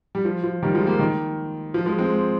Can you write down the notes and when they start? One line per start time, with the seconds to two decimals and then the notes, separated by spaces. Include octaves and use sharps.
0.15 G3
0.25 F3
0.44 F3
0.63 D#3 G3
0.75 F3 G#3
0.87 G3 A#3
1.00 D#3
1.74 F3
1.86 F3 G#3
1.98 G#3 C4